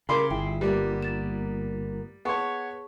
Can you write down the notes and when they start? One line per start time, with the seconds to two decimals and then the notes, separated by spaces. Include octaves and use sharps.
0.09 C#3 G3 A#4 F5 B5 C6 D6
0.31 G1 E4 G#4 G5
0.61 A#2 G3 A#3 B3 B4
1.02 A6 E7
2.25 B3 G#4 C#5 A5 C#6